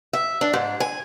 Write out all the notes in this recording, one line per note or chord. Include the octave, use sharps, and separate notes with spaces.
E5
D4
G#2
G#5